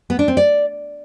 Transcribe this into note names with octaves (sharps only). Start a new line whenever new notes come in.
B3
D4
C4
D5